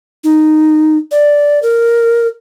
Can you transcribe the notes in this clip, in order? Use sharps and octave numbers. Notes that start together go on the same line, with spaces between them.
D#4
D5
A#4